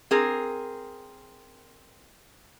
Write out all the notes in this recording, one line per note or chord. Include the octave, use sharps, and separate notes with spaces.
C4 G#4 A#4